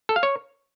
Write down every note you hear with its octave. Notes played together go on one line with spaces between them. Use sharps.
A4
F5
C#5